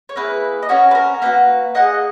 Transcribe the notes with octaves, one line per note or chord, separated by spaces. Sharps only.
C#5
A#3 E4 G#4 B4
D#5
C#4 F#4 A#4 C#5
B4
A#4
A#3 D#4 F#4 B4
A#3 D#4 G#4 D#5 F#5